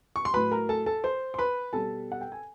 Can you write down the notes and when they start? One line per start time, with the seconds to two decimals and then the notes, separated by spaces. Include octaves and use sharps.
0.16 C#6
0.25 C6
0.34 A2 F#3 B4 B5
0.51 A#4 A#5
0.69 A4 A5
0.86 A4 A5
1.04 C5 C6
1.34 C6
1.38 B4 B5
1.73 B2 G3 A4 A5
2.12 F#5
2.21 G5
2.32 G#5